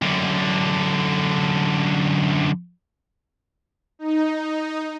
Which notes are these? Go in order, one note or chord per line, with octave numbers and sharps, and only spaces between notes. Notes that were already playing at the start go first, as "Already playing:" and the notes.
F#2 D3
D#4